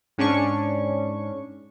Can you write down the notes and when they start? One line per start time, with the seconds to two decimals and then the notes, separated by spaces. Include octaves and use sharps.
0.18 G#2 C#4 D4 C#6